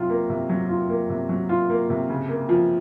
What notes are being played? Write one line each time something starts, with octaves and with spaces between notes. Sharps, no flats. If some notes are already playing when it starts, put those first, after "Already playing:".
Already playing: C3 F#3 F4
A#3
C3
F#3
F4
A#3
C3
F#3
F4
A#3
C3
C#3
A#3
F3